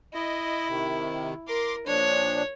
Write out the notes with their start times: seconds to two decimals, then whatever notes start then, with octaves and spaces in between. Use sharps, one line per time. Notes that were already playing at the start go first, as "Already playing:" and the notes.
0.14 E4 D#5
0.68 C3 D#3
1.48 A#4 C6 D6
1.87 A#2 F3 D4 C#5